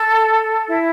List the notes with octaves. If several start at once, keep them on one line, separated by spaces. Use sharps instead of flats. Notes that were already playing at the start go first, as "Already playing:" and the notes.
Already playing: A4
E4